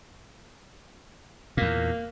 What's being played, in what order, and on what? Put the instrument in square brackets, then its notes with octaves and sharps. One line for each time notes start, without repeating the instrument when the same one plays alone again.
[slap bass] E2 A#2 [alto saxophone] A#3